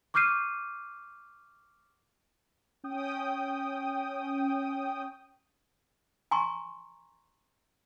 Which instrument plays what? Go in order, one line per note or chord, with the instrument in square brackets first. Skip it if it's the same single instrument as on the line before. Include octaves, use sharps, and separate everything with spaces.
[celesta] C#6 D6 F6 G6 C7 D#7
[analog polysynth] C#4 G5 D#6
[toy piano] G#5 A#5 C6 C#6